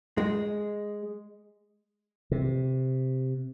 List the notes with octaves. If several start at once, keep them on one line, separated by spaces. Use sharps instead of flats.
G#3
C3